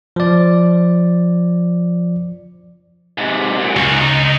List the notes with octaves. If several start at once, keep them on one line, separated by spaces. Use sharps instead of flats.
F3 D5
G#2 C3
F#2 A#2
C#2 C#4 F#4
D#4